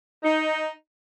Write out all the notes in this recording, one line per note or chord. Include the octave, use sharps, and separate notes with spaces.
D#4